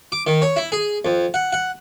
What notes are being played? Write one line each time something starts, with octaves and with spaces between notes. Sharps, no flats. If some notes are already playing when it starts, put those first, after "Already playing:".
D6
D#3
C#5
E4
G#4
F2
F#5
F#5